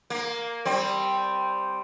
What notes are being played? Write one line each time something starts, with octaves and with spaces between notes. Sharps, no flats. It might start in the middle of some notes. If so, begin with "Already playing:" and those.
A#3
G3 C4